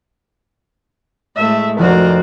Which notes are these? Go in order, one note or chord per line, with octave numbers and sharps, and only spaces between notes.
A2 G#3 A3 E5
F1 F#4 A#4 C5 D5